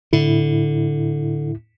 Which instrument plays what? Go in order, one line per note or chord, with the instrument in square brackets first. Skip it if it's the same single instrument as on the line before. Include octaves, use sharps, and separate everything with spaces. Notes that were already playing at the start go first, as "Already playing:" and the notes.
[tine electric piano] A2 E4 [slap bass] D3